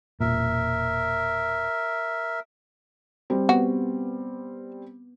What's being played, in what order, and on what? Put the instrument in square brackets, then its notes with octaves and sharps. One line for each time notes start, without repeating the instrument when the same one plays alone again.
[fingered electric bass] E1 A#2 [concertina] A#4 E5
[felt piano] G3 C4
[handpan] B3 [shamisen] F#4